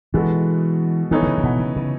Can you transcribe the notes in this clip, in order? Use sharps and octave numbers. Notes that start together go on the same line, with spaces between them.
B2 E3 G#3 B3 F#4 A4
D#3 E3 B3 D#4 A4 C#5
D#3
C#3
C#3
B2
C#3
C#3